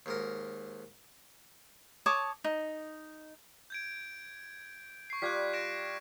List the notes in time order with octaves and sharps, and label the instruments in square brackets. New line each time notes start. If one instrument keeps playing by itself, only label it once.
[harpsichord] D#2 G#2 A#4
[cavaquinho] C#5 A5 D6 D#6
D#4
[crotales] G6 G#6 D7
C#6 C7
[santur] G3 F4 G5 [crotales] F#6 G#6 B6
[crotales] A#6 D7 E7